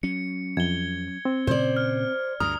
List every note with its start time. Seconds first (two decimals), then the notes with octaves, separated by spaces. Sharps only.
0.03 F#3 C#4 C#7
0.57 F2 G#6 G7
1.25 C4
1.47 A#2 C#3 C5 D5
1.77 F6
2.40 D2 G2 A#5 D#6 F6